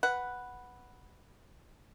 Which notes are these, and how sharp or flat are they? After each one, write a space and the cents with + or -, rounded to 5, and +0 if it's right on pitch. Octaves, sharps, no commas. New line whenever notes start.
B4 +0 F#5 +0